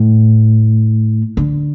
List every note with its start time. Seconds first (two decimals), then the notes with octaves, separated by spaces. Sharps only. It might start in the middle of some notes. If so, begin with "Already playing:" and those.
Already playing: A2
1.37 D3